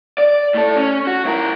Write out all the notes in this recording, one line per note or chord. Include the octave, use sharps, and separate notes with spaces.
D5
A2 A4
C#4
F#4
E4 A#4